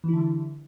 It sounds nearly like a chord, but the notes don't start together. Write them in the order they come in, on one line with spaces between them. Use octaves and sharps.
E3 E4 D3 G3